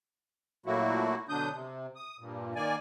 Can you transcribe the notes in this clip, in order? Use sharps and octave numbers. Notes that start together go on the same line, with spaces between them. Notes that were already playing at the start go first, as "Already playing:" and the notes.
A#2 F#3 A3 A#3 E4 F#4
B2 D3 F#3 D4 D#6 G6
C3
D#6
G2 A#2
D#3 A#3 D5 G#5